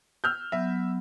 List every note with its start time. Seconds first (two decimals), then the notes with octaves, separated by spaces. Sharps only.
0.24 E6 F6 G6
0.52 F#3 B3 E5